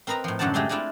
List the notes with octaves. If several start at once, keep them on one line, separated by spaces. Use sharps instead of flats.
C4 A#4 B4 D#5 A#5
A2 F3
F#2 D3 F#3 C5 F#5 A5
G#3 A3 G4 G#5 A5 C6
G#3 A3 D4 E4 F4